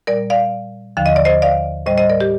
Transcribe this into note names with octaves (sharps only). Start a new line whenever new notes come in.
A#2 G3 A#4 D5
D5 F5
D#2 D3 F3 F5
D#5
D5
C5 D#5
D5 F5
A2 G3 C5 D#5
C5 D#5
A#4 D5
G4